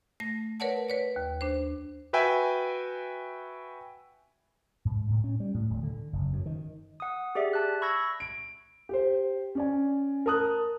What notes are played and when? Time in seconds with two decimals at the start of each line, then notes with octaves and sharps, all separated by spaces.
0.20 A3 A#6
0.60 A#4 B4 C#5 D5 F#5 A5
0.88 B4 C#5 D5
1.16 D#2
1.41 D4 C5
2.13 F#4 B4 E5 G5 G#5
4.85 G#2
5.10 A2
5.24 C#4
5.40 G3
5.54 A2
5.70 D1
5.83 D3
6.13 F#1
6.33 F#2
6.46 D#3
7.00 F#5 D#6
7.35 G4 G#4 D5 E5
7.53 A5 F#6
7.82 B5 C#6 E6 G#6 A#6
8.20 D7
8.89 G4 C5
9.55 C#4 D5 G#5
10.26 A#4 A5 D#6 F#6